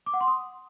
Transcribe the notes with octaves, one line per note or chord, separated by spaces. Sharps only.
D6
F#5
C6
D#6